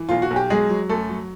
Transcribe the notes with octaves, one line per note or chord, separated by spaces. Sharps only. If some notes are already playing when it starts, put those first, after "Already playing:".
Already playing: E3
B1 F4
F#4
B1
G4
F#3 G#3 G#4
F#3
F#2 A3 A4
F#3